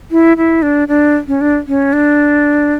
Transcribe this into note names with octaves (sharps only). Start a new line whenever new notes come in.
E4
E4
D4
D4
C#4
D4
C#4
D4